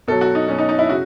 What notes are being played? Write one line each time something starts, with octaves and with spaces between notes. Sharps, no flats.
B2 F#3 A4
F#4
D#4
B2 F#3 C#4
D#4
D#4
E4
C#3 F#4